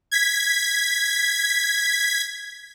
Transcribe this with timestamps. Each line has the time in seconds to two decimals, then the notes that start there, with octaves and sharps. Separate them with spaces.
0.12 G#6 B6